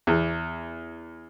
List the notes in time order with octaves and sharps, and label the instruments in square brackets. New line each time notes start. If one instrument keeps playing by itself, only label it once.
[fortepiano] E2